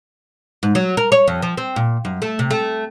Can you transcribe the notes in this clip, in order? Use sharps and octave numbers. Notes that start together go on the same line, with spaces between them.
G#2
F#3
A#4
C#5
F2
F3
C4
A#2
F#2
A3
C3
A3